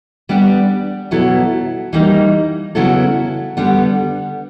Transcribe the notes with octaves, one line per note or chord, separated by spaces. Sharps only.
G3 B3 D4 G4
B2 F#3 B3 E4 A4
E3 G3 A#3 D#4
C#3 F#3 B3 E4 A4
D3 G3 B3